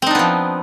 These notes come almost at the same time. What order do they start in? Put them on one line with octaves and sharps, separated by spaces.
C4 D#4 D4 B3 F3